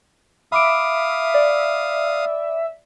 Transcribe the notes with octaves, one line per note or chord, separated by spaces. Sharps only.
E5 F5 B5 D6 D#6 D7
D5